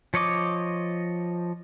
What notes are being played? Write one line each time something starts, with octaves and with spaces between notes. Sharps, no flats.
F3 C#5 D#5 D6